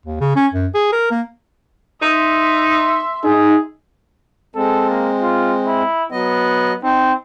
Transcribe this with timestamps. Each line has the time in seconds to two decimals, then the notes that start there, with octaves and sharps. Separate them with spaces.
0.06 D#2
0.21 C#3
0.36 C#4
0.54 F#2
0.75 G#4
0.93 A#4
1.11 A#3
2.02 D#4 E5 C6
3.24 D#4 G#4
4.55 G#3 C4 A4
4.90 A#3
5.21 F4
5.67 E4
6.12 F#3 B3 D#5
6.83 C4 D#4